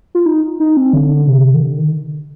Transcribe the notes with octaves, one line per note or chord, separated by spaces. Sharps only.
F4
D#4
D#4
C4
D3
C3
D#3
D3
D#3